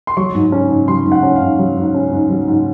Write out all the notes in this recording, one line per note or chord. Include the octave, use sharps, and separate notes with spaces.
C6
F#3 C#6
G#2
C#4
G#2
F#3 C6
G#2
F#5
C#4
F5
G#2
F#3
G#2
C#4
G#2
F#3
G#2